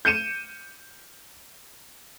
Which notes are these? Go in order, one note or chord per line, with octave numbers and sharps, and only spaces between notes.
G6 C#7 D#7 E7